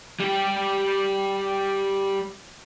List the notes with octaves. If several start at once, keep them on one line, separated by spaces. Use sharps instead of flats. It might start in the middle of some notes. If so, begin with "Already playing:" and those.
G3 G4